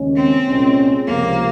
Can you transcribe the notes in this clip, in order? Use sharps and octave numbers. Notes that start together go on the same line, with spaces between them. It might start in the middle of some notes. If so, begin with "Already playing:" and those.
Already playing: D#2 C#3 G#3 C#4
C4
C2 A#2 G#3 C#4
C#2 C3 F3 A#3